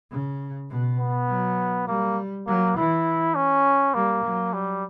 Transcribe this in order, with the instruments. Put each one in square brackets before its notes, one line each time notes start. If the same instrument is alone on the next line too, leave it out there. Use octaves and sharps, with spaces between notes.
[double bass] C#3
B2
[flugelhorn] B3
[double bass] F#3
[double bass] G3 [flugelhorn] A#3
[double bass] F#3 [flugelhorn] A#3
[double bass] E3 [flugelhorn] E4
[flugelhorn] C#4
[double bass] G3 [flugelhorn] A#3
[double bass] F#3
[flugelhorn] G3